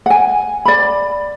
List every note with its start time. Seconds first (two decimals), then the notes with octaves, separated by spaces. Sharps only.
0.06 F#5 G#5
0.65 D5 B5